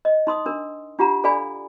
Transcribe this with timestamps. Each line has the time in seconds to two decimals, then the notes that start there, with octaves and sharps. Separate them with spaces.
0.05 D#5
0.27 D#4 C6 D#6
0.46 D4 A#4
0.99 D4 F4 G4 F#5 A#5
1.24 D4 A4 D5 F5 G#5 B5